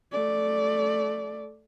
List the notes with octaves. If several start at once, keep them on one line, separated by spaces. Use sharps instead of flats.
A3 D5